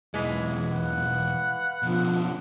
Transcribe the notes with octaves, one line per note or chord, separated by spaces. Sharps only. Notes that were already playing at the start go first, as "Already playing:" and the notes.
B1 E2 E3 G#3
B4 F5 F#5
B2 D3 F3